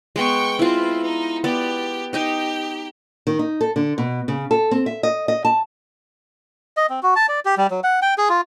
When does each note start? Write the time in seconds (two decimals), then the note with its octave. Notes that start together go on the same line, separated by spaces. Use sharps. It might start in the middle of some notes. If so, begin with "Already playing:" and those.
0.16 G#3 B3 G5 C#6
0.59 C4 E4 F4 B4
1.02 D#4
1.44 B3 G4 D5
2.13 D#4 G4 D#5 G5
3.27 D#3
3.39 D#4
3.61 A4
3.76 D3
3.98 B2
4.28 C#3
4.51 A4
4.71 C4
4.86 E5
5.03 D#5
5.28 D#5
5.45 A5
6.77 D#5
6.90 C4
7.03 F#4
7.16 A5
7.29 D5
7.45 G4
7.57 G3
7.71 F#3
7.84 F#5
8.02 G5
8.18 G#4
8.29 F4